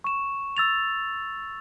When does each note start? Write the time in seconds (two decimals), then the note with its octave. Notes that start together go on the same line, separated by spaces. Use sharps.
0.04 C#6 E7
0.57 E6 A6 F7